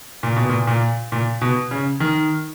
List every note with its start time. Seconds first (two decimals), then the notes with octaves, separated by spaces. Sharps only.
0.23 A#2
0.36 B2
0.49 A#2
0.67 A#2
1.12 A#2
1.41 B2
1.71 C#3
2.00 D#3